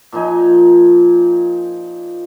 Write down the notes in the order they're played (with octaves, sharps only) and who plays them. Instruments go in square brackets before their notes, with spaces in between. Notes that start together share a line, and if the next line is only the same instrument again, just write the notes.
[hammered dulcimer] A#2 F3 D#4 G#5